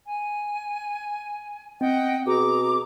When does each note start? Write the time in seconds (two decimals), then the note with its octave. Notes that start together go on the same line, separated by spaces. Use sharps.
0.06 G#5
1.81 C4 D#5 F#5 G5
2.26 B2 G#4 A#5 D6